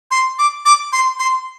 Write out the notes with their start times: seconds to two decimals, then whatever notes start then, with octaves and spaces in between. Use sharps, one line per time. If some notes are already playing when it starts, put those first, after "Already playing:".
0.11 C6
0.39 D6
0.65 D6
0.92 C6
1.19 C6